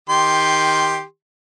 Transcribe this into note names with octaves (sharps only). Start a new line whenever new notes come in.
D#3 G4 C6